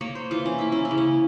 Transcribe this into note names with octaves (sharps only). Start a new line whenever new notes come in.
A#3 C#5
C5
E3 F4
C#4
A#3 E4
C#4
E4
C#3
C#4